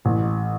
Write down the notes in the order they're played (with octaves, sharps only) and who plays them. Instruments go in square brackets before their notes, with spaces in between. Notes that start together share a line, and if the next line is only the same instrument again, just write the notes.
[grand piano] A1